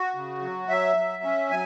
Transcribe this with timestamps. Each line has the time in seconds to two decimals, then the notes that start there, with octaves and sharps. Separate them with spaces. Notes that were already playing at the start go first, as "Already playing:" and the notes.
Already playing: F#4
0.15 C#3
0.41 F#3
0.68 F#3 E5
0.97 F#3
1.23 C#4
1.51 F#3 G#5